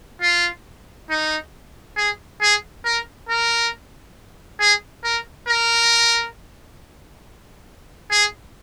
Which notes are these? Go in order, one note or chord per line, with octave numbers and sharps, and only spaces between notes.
F4
D#4
G#4
G#4
A#4
A#4
G#4
A#4
A#4
G#4